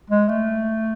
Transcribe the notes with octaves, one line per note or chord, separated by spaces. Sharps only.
G#3
A3